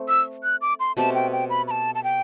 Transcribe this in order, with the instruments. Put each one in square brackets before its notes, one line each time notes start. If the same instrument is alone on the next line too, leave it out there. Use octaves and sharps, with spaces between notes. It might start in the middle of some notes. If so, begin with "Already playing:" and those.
Already playing: [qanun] A3 C4
[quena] E6
F#6
D6
C6
[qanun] B2 A3 C4 G4 [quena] A5
[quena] G5
G5
B5
B5
A5
A5
G5